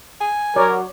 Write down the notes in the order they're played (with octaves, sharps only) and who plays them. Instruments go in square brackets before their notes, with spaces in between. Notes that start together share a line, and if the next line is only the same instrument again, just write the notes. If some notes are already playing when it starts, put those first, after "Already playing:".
[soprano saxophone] G#5
[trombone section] F#3 [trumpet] A#4 [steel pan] C#5 D5